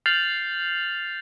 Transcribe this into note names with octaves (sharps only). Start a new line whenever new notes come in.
F6 G6 A6 C7 F7 F#7